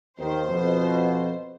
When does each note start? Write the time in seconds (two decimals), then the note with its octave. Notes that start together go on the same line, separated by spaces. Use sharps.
0.19 D#2 D#3 C5
0.48 F2 B2